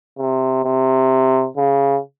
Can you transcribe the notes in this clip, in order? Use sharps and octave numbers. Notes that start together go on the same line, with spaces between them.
C3
C3
C#3